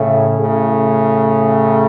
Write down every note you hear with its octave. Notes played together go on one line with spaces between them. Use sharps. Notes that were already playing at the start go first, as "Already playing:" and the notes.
Already playing: A2 C#3
A2 C#3